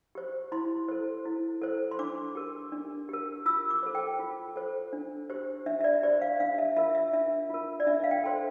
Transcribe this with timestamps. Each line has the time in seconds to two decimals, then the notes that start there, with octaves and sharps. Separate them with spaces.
0.15 G4 C5
0.52 E4 C6
0.88 A4 C5
1.26 E4
1.62 A4 C5
1.91 C6
1.99 D4 D6
2.35 G4 A#4
2.72 D4
3.09 G4 A#4
3.46 F4 E6
3.70 D6
3.83 A4 C5
3.95 G5
4.19 F4
4.56 A4 C5
4.93 D4
5.30 G4 C5
5.66 D4 E5
5.81 E5
5.84 D5
6.03 G4 C5 D5
6.21 F5
6.40 D4 F5
6.58 E5
6.76 F4 A#4 E5
6.95 E5
7.13 D4 E5
7.50 F4 A#4
7.80 D5
7.87 D4 E5
8.04 F5
8.11 G5
8.24 A4 C5 C6